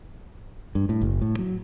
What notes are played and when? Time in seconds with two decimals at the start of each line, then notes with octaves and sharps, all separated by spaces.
0.75 G2
0.89 A2
1.01 F#1
1.22 A2
1.39 F#3